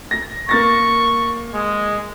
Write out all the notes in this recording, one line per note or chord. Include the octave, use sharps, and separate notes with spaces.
A#6
A#3 C#6 A6 A#6
G#3